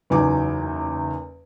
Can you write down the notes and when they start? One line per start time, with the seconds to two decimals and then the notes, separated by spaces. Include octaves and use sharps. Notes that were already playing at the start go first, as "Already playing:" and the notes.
0.10 F#1 E2 F#3 D#4 G#5 D6